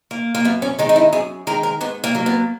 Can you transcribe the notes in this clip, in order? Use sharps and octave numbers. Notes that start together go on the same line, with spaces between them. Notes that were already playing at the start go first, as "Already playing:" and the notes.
A#3
A#3
F#2 B3
C#4
D#3 G#3 D#4
D#4
E4
F#2 G#4
D#3 G#3 A#4
A#4
G#2 B3
A#3
F#3 A#3
B3